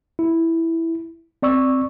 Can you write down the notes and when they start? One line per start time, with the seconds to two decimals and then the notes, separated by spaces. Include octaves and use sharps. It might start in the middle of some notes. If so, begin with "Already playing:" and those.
0.19 E4
1.43 C4 D5 C#6 E6